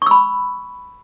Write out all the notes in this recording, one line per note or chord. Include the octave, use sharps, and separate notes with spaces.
B5 C#6 E6